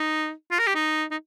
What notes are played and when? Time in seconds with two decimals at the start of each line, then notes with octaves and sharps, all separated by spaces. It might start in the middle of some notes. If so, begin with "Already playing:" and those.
Already playing: D#4
0.51 F4
0.59 A#4
0.67 G4
0.75 D#4
1.11 D#4